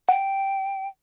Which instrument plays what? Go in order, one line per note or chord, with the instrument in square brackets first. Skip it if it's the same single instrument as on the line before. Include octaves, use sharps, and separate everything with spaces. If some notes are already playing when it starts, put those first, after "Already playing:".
[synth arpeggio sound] F#5 [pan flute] G5